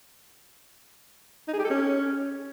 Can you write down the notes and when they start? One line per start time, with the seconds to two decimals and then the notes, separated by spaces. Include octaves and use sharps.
1.48 D#4
1.53 G#4
1.59 G4
1.64 A4
1.70 C#4